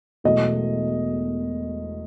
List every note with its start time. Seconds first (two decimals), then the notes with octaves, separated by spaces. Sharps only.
0.24 E1 E2 B2 F#3 A3 D#5